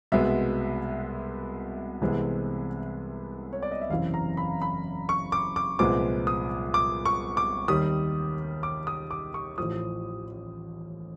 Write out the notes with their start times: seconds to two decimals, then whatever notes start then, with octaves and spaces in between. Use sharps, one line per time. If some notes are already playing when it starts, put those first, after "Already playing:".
0.12 C2 B2 G#3 B3 E5
2.01 C2 C3 E3 G#3 B3
3.53 C#5
3.63 D5
3.71 D#5
3.81 E5
3.90 F#1 E2 C3 E3 F5
4.14 A#5
4.37 B5
4.61 B5
5.09 C#6
5.32 D6
5.56 D6
5.79 C2 A#2 F3 G#3 B3 D6
6.27 D#6
6.74 D6
7.05 C#6
7.37 D6
7.68 D#2 D#3 G3 D#6
8.63 D6
8.87 D#6
9.11 D6
9.34 C#6
9.58 A1 A2 F3 D#6